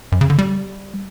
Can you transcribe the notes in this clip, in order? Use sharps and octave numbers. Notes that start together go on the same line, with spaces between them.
F#2
C#3
D3
G3